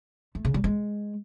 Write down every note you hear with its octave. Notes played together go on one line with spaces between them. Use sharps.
A3
C#3
G3
G#3